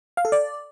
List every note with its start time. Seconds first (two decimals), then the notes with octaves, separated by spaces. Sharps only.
0.17 F5
0.25 A4
0.32 D5